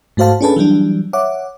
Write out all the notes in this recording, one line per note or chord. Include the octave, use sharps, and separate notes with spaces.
G#2 A3 F#4 C5 F5 A5
C#4 D4 G#4 A4 B4 A5
E3 F#3 G3 D4
C#5 E5 F#5 D6